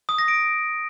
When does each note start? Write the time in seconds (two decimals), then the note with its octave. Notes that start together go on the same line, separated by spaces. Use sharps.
0.09 D#6
0.18 A#6
0.28 D7